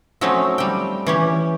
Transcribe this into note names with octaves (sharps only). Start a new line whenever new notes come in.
F3 F#3 A3 C4 C#4 D#4
G3 G5
E3 C#4 G4